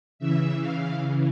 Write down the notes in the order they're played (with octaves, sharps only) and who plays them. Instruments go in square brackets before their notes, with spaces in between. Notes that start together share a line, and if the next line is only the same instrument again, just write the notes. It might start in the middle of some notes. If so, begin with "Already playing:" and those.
[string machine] C#3 E3 E5
F5